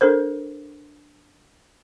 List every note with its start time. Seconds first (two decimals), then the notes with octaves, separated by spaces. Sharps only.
0.01 D4 A4 A#4 C5